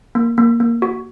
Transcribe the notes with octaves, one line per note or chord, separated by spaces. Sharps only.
A#3
A#3
A#3
F#4